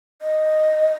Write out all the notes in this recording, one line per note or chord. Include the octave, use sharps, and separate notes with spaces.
D#5